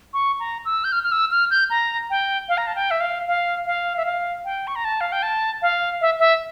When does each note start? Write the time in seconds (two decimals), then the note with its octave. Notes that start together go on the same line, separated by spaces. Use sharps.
0.14 C#6
0.40 A#5
0.65 E6
0.84 G6
0.92 F6
1.03 F6
1.12 E6
1.31 F6
1.51 G6
1.70 A#5
2.10 G5
2.49 F5
2.57 A#5
2.67 A5
2.75 G5
2.91 E5
3.00 F5
3.27 F5
3.66 F5
3.97 E5
4.05 F5
4.45 G5
4.67 C#6
4.75 A#5
4.85 A5
5.01 F5
5.12 G5
5.23 A5
5.62 F5
6.01 E5
6.19 E5